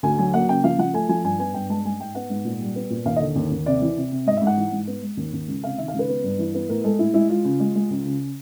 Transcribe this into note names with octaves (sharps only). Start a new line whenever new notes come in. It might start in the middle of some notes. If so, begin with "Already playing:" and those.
D2 G#5
F#3 G#5
A#3 F#5
C#3 G5
F3 F5
F3 F#5
A3 G#5
F3 G#5
G2 G#5
B3 G#5
G2 G5
G#3 A5
G#3 G#5
G#2 G5
B3 F#5
G#2
A#2
G3
B3
A#2
D#2 F5
D#5
D3
D#2
D#2
C3 D5
E3
C3
C3
G#2 D#5
E5
G#2
F#5
E3
G#2
B3
G#3
D#2
D#2
C#2
C3 F5
D#3 E5
F5
C#2
B4
B3
G2
E3
B3
A2 A#4
G#3 A4
A2 E4
G#3 E4
G#3 F4
C#3
G#3
G#3
C#2
C#3